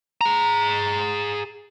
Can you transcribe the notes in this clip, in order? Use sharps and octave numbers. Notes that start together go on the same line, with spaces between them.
G#4 A#5